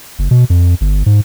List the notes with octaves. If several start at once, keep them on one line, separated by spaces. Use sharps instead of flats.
F#1
B2
F2
G1
G#2